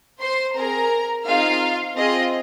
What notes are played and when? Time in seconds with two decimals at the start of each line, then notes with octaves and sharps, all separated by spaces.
0.20 C5 C6
0.55 C4 G#4 A#4 A#5
1.25 C4 D#4 F4 G#4 F5
1.96 C4 F4 G#4 D#5